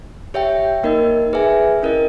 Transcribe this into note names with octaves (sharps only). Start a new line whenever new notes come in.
G4 C#5 E5 G5
A#3 D#4 A#4 D#5
G#4 B4 E5 G#5
C#4 E4 A#4 D#5